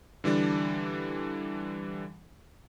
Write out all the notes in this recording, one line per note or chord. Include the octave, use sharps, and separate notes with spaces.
D3 E3 G3 D4